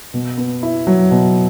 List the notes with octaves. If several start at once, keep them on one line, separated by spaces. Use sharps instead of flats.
B2
B3
E4
F#3
B2